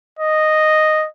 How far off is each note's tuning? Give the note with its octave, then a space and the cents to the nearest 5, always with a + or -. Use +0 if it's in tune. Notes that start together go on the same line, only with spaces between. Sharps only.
D#5 -5